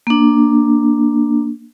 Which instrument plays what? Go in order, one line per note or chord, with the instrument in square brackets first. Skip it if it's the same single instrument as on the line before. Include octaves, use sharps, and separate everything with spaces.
[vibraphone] A#3 D4